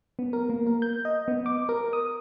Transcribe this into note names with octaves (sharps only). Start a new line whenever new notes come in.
B3
A#4
A#3
A#4
G6
D#5
B3
D6
A#4
D#6